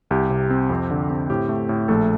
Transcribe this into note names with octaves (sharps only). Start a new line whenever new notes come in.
C2 G4
C3
C4
F2
D3
C4
A2 G4
A3
A2
A#1 A3 A4